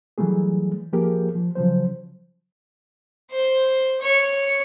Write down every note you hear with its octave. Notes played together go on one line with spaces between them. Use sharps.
E3 F#3 G3 A3 G#4
F3 A#3 G4 G#4 A#4
F3
C#3 F3 F#3 C5
C5
C#5